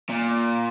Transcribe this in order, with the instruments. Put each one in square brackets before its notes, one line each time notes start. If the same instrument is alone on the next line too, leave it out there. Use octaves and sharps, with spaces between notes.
[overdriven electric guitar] A#2